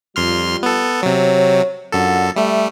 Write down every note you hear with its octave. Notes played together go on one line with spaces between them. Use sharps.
F2 G3 F4 C6 F6
B3 A4
C3 F#3 C#5
F#2 D4 F4 A4 F#5
G3 A3 E5